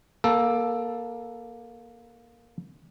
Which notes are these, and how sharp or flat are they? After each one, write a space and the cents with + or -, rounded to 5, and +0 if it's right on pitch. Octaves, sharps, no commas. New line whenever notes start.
A#3 +15 A4 +0